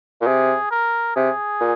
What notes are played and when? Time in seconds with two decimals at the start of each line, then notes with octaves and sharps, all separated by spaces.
0.21 A#2
0.26 C3 G#4
0.71 A#4
1.16 C3 G#4
1.60 A#2